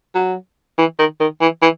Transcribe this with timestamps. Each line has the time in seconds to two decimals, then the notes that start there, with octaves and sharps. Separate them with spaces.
0.15 F#3
0.78 E3
0.99 D#3
1.20 D#3
1.41 E3
1.62 E3